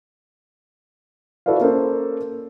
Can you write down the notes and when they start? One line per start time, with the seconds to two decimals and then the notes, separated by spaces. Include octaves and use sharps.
1.46 E4 F#4 A4 B4 D5 F5
1.61 A#3 C#4 A4 A#4 C5